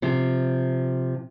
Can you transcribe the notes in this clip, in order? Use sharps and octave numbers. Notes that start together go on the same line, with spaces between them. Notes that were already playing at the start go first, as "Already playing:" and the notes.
C3 F3